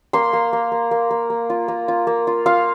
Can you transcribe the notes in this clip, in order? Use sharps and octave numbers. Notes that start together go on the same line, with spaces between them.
A#3 C6
A#3
A#3
A#3
A#3
A#3
A#3
F4
A#3
F4
A#3
F4
F4 F5